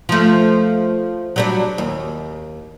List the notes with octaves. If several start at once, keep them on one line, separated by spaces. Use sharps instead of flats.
F3 A3
F#3 G3 D4
D#2